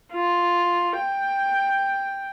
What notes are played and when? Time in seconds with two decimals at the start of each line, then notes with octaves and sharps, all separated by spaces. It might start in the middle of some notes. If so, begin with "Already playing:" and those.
0.13 F4
0.96 G5